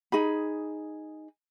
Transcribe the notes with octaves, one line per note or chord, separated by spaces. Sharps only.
D#4 G#4 B5